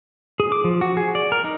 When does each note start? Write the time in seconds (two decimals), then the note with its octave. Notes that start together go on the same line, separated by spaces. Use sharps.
0.40 G#4
0.52 D6
0.64 F3
0.81 F#4
0.97 G#4
1.15 D5
1.32 A#4
1.44 D#4